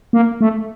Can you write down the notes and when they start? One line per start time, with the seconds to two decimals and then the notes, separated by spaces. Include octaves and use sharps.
0.13 A#3
0.41 A3